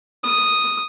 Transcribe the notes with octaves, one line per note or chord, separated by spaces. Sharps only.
D#6